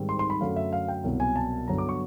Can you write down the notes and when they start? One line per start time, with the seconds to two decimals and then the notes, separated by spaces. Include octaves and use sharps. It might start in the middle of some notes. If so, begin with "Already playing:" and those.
Already playing: G#2 D#3 G3 C4
0.09 C6
0.19 C6
0.30 B5
0.41 F#2 D3 F#3 A3 F5
0.56 E5
0.73 F5
0.88 G5
1.04 C2 B2 F#3
1.20 G#5
1.36 A5
1.68 G2 D3 F#3 B3 A#5
1.78 D6
1.89 C#6